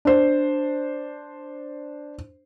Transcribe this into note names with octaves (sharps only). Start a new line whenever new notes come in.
D4 C5